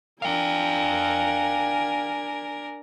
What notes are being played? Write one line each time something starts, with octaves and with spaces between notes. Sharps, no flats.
D4 A#4 F5 G5 G#5